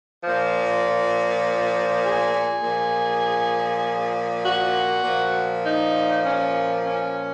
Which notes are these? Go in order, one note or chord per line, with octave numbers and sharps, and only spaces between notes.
A#2 F3
G#4
A#2 F3
F#4
A#2 F3
D#4
C#4
C#4